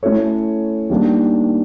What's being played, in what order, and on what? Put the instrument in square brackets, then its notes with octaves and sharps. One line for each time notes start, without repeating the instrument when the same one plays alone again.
[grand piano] A3 C#4 E4 A4 C#5
D#3 G3 A#3 D4